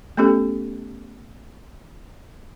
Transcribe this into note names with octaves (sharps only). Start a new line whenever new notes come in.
A3 B3 C#4 G4 A4